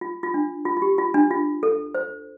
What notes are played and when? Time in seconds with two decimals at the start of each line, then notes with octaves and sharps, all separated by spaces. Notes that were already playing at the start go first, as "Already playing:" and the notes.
0.01 F4
0.23 F4
0.34 D4
0.65 F4
0.77 F4
0.82 G4
0.98 F4
1.14 D4
1.31 F4
1.63 A4
1.95 C5